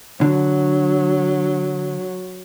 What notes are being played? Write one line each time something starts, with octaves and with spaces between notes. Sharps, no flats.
D3 F#3